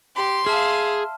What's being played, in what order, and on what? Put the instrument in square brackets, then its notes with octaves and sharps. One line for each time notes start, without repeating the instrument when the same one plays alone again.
[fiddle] G4 [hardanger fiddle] C6
[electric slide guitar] G#4 [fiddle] E5 F5 [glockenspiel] A5 F6